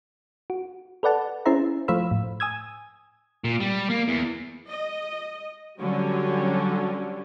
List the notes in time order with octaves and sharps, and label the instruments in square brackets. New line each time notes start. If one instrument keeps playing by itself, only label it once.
[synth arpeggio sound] F#4
A4 B4 D5 F#5 A5
C#4 E4 G#4 C5 E5 A#5
F3 A3 C5 F5 B5 E6
A2
G#5 D#6 E6 G#6
[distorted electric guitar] A#2
G3
A#3
E2
[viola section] D#5
D3 F#3 G3 C#4